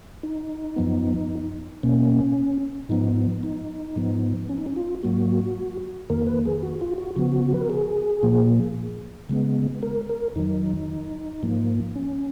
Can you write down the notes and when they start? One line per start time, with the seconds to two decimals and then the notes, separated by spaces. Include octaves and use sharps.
0.23 D#4
0.76 F#2 F3 B3
1.83 B2 A#3 C#4
2.89 G#2 F3 B3 D#4
3.43 D#4
3.96 G#2 F3 B3
4.49 C#4
4.58 D#4
4.66 C#4
4.76 F4
5.03 G#2 F#3 A#3 F#4
6.10 F2 D#3 A#3 A#4
6.27 B4
6.45 G#4
6.63 F#4
6.81 F4
6.98 F#4
7.16 C#3 F3 B3 F#4
7.54 B4
7.61 A#4
7.70 G#4
8.23 A#2 F3 A#3
9.29 C#3 G#3 B3
9.83 A#4
10.09 A#4
10.36 F2 D#3 F#3 D#4
11.43 G#2 F3 A#3
11.96 C#4